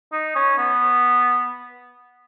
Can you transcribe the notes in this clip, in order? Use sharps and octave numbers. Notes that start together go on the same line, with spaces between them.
D#4
C#4
B3